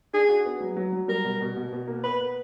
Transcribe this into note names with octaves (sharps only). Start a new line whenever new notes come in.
D4 G#4
F#4
B3
F#3
F#3
F#3
G3 A#4
B2
B2
B2
B2
A#3
B3 B4